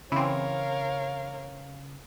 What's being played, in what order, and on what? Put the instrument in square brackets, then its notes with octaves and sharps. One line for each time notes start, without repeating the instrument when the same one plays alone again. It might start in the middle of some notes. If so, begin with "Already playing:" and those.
[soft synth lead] C#3 [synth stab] E3 C4 [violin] A#4 C#5 [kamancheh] F5